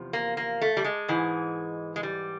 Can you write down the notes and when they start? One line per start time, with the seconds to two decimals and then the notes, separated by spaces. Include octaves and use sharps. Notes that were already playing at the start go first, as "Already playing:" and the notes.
Already playing: E2 C3 F3
0.13 A#3
0.37 A#3
0.61 A3
0.77 G3
0.84 G#3
1.08 G#2 E3
1.96 G#3
2.03 G3